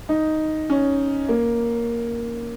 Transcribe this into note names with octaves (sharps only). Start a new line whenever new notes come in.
D#4
C#4
A#3